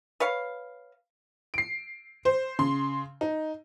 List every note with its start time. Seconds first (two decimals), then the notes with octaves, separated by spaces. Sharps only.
0.20 B4 C#5 F5
1.54 C7 D7
2.25 C5
2.59 C#3 C6
3.21 D#4